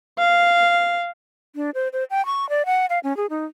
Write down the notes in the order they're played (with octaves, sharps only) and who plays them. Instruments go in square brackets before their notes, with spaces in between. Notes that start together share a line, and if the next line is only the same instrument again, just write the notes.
[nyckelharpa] F5
[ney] D4
C5
C5
G5
C#6
D5
F#5
F5
C#4
G#4
D#4